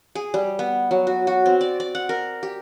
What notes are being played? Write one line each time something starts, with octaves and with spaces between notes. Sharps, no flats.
G#4
G3
B3
F#3
F#4
F#4
C4
D5
D5
F#5
A#4
G4